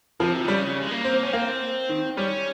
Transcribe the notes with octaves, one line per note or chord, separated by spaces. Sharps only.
C3 F3
D#3
C#3 G3
G#3
A#3
C4
C#4
A#3 C4
D#3
G3 C#4